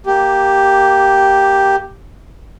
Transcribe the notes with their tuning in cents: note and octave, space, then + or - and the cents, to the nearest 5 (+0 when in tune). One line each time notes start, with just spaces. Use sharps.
A#3 +0 G4 +0